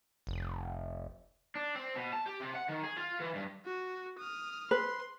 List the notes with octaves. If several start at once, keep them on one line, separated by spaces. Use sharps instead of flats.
F1
D4
C4
B2
A5
G4
C3
F#5
D#3
G#4
F4
E3
G2
F#4
D#6 F6
B4 C6